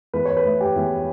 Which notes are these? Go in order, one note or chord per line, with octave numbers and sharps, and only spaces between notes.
E2 B4
C#5
B4
A3
G4
E2